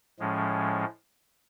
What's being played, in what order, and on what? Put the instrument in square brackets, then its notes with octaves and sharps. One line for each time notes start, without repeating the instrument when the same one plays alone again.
[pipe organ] A2 F3 G#3 C#4